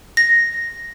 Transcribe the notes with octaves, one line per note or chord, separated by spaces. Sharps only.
A#6